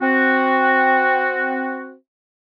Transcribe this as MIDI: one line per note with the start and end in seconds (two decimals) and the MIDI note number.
0.01 1.94 60
0.01 1.94 66